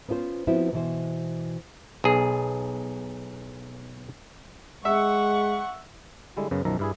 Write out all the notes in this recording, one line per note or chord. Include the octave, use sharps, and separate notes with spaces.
B3 C#4 F4 A4 C5
F3 B3 C4 E4 F#4
B2 E3 C5
B1 G#4
G#3 E5 F#5 C#6
D3 G3 G#3 E4
F#2 C#3 F#3 B3
B1 F#2 D#3 F3 E5 A#5
G2 E4 G#4